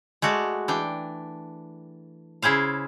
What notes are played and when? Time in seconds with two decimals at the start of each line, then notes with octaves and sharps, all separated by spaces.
0.22 G#3 A3 F#4 D5
0.68 E3 D4 G5
2.42 C#3 E4 G#4 C5 F5